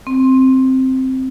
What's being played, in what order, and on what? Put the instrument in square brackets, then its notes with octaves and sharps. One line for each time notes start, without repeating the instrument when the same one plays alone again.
[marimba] C4